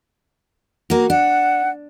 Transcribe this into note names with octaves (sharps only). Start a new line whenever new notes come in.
A#3 F#4
D4 F#5